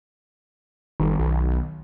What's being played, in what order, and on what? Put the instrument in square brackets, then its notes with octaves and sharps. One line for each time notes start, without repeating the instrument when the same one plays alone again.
[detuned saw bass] G1 [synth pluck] D#3
[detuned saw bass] B1